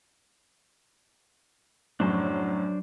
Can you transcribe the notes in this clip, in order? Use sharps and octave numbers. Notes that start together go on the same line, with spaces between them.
F#2 A2 F#3 D4 C5